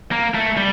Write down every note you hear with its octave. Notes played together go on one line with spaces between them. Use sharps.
A#3
A3
G3